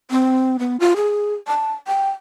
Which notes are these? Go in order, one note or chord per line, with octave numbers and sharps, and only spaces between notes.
C4
B3
F4
G#4
A5
G5